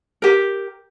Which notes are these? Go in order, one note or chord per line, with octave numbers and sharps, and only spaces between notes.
G4 A#4